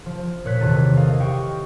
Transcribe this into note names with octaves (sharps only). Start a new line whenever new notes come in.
F3
A#2 C#5 F#6 B6
E2 C3 D#3 A4 A6 D#7
E4 A4 D#5 F5
G4 D#5 F5 G5 C#6